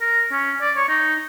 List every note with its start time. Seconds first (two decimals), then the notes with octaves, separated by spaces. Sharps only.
0.01 A#4
0.32 C#4
0.61 D5
0.76 C#5
0.89 D#4